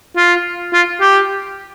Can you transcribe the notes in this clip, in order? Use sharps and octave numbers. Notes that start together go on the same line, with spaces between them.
F4
F4
G4